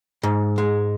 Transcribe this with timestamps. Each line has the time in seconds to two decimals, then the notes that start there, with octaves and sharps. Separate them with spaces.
0.23 G#2
0.58 G#3